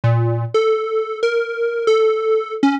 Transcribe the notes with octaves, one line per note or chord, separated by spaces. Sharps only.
A#2
A4
A#4
A4
C#4